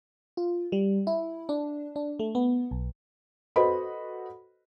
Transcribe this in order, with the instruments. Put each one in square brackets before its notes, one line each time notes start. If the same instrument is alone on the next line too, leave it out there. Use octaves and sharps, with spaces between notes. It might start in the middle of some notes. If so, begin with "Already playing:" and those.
[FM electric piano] F4
G3
E4
D4
D4
A3
B3
B1
[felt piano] F#4 A4 B4 C5 D#5 B5